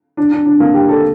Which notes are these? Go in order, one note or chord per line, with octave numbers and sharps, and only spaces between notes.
D4
D4
D4
A#3
G4
A4